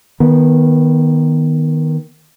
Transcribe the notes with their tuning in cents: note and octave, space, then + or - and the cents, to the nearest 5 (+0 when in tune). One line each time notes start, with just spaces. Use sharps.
D#3 +0 B3 -15